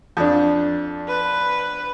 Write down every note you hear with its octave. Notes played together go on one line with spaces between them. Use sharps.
F2 D4
B4